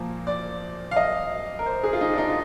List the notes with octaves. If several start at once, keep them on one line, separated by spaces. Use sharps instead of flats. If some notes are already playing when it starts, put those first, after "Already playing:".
Already playing: A#2 F3 A#3 C5
D5
F5
D#5
A#4
C5
G#4
F4
D#4
D4
D#4
F4